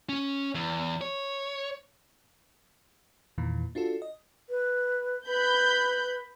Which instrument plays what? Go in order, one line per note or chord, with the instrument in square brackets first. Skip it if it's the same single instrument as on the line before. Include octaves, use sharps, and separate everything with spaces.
[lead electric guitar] C#4
E2
C#5
[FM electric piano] E2 A#2 D#3 E3
D4 F4 F#4 A4
D#5
[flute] B4
[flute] B4 [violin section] B5 G6